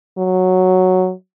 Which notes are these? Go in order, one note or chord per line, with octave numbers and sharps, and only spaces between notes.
F#3